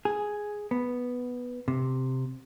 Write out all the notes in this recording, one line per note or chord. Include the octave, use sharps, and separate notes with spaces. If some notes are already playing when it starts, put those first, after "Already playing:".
G#4
B3
C3